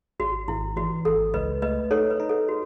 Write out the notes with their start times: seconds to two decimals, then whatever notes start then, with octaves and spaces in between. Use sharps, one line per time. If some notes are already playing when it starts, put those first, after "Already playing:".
0.20 G#1 F#4
0.48 G#1 E4
0.76 E3 F#4
1.05 G#1 A4
1.34 C#2 B4 D#5
1.62 A3 B4 D#5
1.91 D#4 A4 C#5
2.10 B4
2.20 D#4
2.29 A4
2.48 F#4